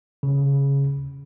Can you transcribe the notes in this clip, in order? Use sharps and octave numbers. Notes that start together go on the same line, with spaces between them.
C#3